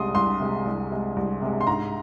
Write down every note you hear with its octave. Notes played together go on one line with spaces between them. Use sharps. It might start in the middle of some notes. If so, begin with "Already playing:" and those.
Already playing: C2 C3 G#3 C6 D#6
C2 C6
C3 G#3
C2
C3 G#3
C2
C3 G#3
C6
G#2 A#5